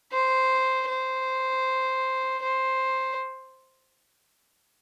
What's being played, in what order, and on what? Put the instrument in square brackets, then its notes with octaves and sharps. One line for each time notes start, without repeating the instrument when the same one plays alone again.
[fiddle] C5
C5
C5